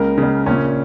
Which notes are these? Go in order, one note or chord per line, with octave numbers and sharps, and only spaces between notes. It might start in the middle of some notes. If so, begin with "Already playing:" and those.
Already playing: C#2 C#3 A#3 A#4
C#2 C#3
A#1 A#2 C#3 C#4